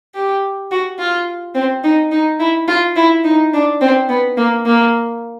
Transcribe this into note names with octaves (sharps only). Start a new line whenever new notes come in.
G4
F#4
F4
C4
D#4
D#4
E4
F4
E4
D#4
D4
C4
B3
A#3
A#3